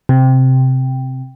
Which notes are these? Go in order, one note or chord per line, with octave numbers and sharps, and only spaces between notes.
C3